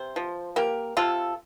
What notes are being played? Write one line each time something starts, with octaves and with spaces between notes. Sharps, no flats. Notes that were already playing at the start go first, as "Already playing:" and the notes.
Already playing: C3 C5
F3
A#3 G4 A#4
C3 F4 A4